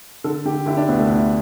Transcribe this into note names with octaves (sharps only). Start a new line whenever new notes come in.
D3 A4
D3 G4
D3 E4
D4
D2 B3
A3
D2